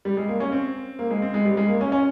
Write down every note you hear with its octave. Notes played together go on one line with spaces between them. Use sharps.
G3
G#3
A#3
C#4
C4
A#3
G#3
C4
G#3
G3
G#3
A#3
C#4
C#4